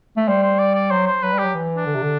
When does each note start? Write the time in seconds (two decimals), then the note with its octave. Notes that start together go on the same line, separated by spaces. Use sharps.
0.17 A3
0.28 G3 C5
0.43 C5
0.59 D5
0.75 D5
0.91 F#3 C5
1.07 C5
1.23 F#3 B4
1.33 G3
1.39 G4
1.44 F#3
1.54 E3
1.76 D4
1.86 D3
1.94 C3
2.02 D3